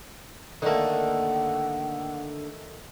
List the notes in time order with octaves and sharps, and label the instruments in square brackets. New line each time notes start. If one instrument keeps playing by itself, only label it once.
[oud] D3 A#3 [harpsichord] D#3 A3 [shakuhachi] F#5